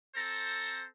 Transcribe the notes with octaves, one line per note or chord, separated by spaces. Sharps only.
C4 A4 C5 A#5